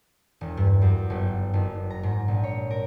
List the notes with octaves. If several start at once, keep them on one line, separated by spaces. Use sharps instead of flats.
E1
G2
F#2
G1
F#1
A#5
G#2
A#1
C#5
A#4